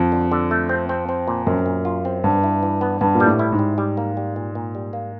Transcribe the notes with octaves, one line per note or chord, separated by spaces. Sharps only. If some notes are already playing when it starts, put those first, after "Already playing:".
Already playing: F2
D3
D3
A3
C4
C4
C4
A#2
F#2 C4
A#2
F4
C4
G2 B3
E4
E3
B3
G2 B3
A#2
G3
A2
E4
G#2
G3
G3
A#3
G3
A#2
A#2
G3
A#3